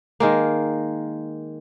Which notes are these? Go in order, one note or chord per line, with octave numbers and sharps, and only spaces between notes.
D#3 G#3 A#3